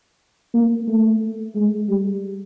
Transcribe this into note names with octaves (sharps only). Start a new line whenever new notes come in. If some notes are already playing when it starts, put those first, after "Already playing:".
A#3
A3
G#3
G3